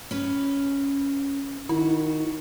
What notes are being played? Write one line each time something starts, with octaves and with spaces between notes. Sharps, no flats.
C#4 B4
D#3 E4 F#4